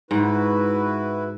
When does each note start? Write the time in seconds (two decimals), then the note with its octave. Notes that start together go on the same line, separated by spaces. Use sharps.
0.11 G#2 E4 F#4 B4